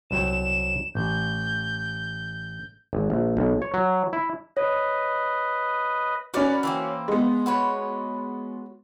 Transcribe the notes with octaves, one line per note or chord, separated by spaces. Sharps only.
C2 F#3 G5 E7
A1 G6
G#1
A#1
B1
C#5
F#3
E4
B4 C#5 D#5
C#4 F#4 A#4 B4 D5
E3 A#3 C4
G#3 B3
F#4 B4 C#5